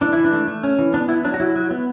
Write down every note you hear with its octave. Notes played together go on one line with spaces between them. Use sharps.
E3 D4
E3 E4
D4
A3
A3
C#4
E3
B3 D4
B3 E4
F#3 D4
F#4
F#3 E4
F#3
B3